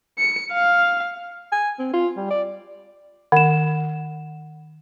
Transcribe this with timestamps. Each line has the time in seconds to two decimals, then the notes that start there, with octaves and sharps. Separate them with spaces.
0.19 C#7
0.53 F5
1.52 G#5
1.79 C4
1.93 F4
2.17 G3
2.31 D5
3.32 D#3 F#5 E7